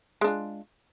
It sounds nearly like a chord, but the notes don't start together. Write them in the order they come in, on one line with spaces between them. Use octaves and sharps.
G#3 D4 F4